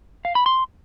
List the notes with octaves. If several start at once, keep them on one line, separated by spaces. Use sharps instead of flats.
F5
B5
C6